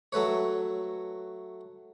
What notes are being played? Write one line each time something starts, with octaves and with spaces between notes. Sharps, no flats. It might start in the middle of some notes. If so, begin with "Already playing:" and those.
F#3 A3 B4 C#5